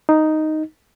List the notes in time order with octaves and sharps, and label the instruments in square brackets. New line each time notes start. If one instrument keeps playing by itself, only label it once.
[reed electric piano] D#4